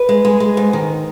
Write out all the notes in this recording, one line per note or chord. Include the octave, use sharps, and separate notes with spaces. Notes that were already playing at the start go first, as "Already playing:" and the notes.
Already playing: B4
G#3
G#3
G#3
G#2
D#3